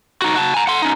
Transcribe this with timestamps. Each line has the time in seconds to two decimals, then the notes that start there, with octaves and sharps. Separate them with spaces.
0.22 D#4 F#4
0.36 F#4 A5
0.54 G#5 A#5
0.67 F#5 C6
0.82 C#4 D#4